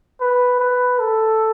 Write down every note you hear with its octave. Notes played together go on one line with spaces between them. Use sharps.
B4
B4
A4